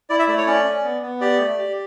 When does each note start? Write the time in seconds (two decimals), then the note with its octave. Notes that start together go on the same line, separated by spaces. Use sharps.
0.10 E4 D5
0.19 E5
0.28 A3 D5
0.38 C#5
0.47 C#4 D5
0.65 C#4
0.84 B3
1.02 B3
1.21 G4 D5
1.39 A3
1.58 G4